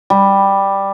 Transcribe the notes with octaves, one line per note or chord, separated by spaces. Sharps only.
G3